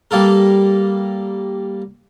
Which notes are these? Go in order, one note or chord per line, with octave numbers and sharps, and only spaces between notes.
G3 A#3 A4 A#4